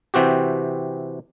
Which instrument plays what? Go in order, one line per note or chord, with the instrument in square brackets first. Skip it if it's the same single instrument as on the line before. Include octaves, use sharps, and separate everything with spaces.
[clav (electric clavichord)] C3 E3 C4 F#4 G4